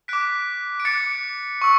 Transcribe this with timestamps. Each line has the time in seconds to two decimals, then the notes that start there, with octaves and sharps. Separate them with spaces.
0.08 D6 F#6 B6 D7
0.80 D7
0.85 D6 F#6 A6 C#7
1.62 C#6 E6